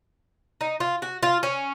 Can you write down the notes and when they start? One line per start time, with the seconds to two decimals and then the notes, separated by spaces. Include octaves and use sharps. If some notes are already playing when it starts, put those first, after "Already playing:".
0.61 D#4
0.80 F4
1.02 F#4
1.23 F4
1.43 C#4